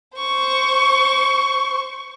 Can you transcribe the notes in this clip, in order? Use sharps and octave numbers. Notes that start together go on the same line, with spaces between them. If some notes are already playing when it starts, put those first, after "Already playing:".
C5 C#6